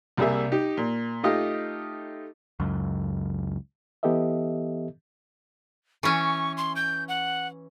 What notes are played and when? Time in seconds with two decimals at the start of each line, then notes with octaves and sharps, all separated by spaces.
0.17 C2 G3 A#3 G#4 E5
0.52 D#4 G4
0.77 A#2
1.23 A3 D#4 F4 G4 D#5 F5
2.60 C#2 F#2
4.03 E3 B3 G4 A4 D#5 E5
6.03 E3 C#4 C#6
6.57 C6
6.76 G6
7.08 F#5